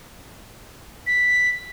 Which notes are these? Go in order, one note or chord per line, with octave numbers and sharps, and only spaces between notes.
B6